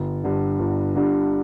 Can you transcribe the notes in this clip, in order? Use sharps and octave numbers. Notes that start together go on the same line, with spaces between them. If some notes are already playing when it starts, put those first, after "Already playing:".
Already playing: G1
G2 D3
G1
G2 D3